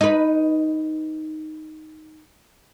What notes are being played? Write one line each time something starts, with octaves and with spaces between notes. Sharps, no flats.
D#4 B4